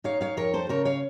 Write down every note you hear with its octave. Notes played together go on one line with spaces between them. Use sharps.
D#4 C#5 F5
C#5 F5
F2 A#4 C#5
A4 C5
C#3 A#4 C#5
C#5 F5